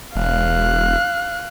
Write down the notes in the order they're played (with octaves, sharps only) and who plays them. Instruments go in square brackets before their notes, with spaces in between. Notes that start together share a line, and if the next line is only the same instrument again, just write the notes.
[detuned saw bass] E1 [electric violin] F5 F#6